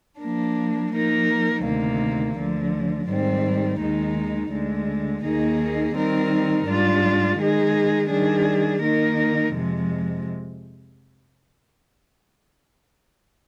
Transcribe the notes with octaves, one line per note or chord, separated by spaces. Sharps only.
F3 A#3 D4
F3 A#3 D#4 A#4
D2 C3 D#3 A#3
D2 D3 F3
G#2 D#3 G3 C4
D#2 D#3 G#3 D#4
D2 D3 G#3
D#2 D#3 A#3 D#4 G#4
D#3 G3 C4 D#4 A#4
G#2 G3 D4 F4
D#3 G#3 D#4 G#4
D#3 G3 D4 G#4
D#3 A#3 D#4 A#4
F2 C3 F3 G#3